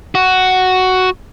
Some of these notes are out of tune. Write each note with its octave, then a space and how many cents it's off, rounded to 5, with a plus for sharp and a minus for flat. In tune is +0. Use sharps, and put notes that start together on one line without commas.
F#4 +5